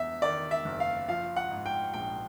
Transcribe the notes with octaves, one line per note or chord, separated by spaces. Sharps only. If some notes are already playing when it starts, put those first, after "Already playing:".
Already playing: E2 E5
D#3 D5
E5
F#1
F5
F3 F5
F#5
G#2
G5
A#1 G5